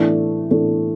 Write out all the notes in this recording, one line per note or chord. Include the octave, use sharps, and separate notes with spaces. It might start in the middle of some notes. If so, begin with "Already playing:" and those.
Already playing: A2 E3 A3 D4 A4
A2 E3 A3 D4 A4